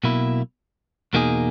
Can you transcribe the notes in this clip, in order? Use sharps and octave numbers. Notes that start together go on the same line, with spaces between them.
B1 B2 A#3 E4
E2 B2 A#3 D#4 G#4